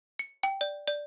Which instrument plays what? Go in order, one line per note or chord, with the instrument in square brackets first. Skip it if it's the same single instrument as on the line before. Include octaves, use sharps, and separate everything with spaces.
[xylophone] C#7
G5
D5
D5